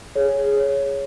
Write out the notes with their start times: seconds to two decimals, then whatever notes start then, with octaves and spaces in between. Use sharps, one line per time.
0.16 G#4 C#5
0.56 C#5